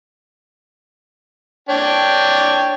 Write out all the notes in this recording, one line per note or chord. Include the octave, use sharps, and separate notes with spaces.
D4 C#5 G5